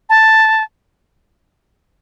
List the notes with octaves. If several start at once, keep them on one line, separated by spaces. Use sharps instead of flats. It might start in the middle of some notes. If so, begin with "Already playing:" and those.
A5